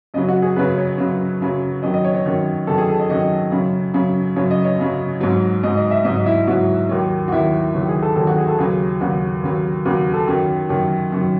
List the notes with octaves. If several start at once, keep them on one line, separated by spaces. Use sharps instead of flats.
F#2 C#3 F#3 D#5
F#4
G#4
F#2 C#3 F#3 B4
C#5
F#2 C#3 F#3
F#2 C#3 F#3
F#2 D#3 F#3 D#5
D#5
C#5
C#5
F#2 D#3 F#3
F#2 D#3 F#3 A4
G#4
A4
D#5
F#2 D#3 F#3 D#5
F#2 C#3 F#3
F#2 C#3 F#3
F#2 C#3 F#3 C#5
D#5
C#5
F#2 C#3 F#3
G#2 F#3
G#2 F#3 D#5
D#5
E5
G#2 F#3 D#5
E4
G#2 F#3 F#4
D#2 D#3 F#3
F#4
D#2 D#3 F#3 E4
D#2 D#3 F#3
G#4
A4
D#2 D#3 F#3 A4
F#4
G#4
A4
D#2 C#3 F#3 G#4
D#2 C#3 F#3 F#4
D#2 C#3 F#3
D#2 C#3 F#3 F#4
A4
F#2 D#3 F#3
F#2 D#3 F#3
F#2 D#3 F#3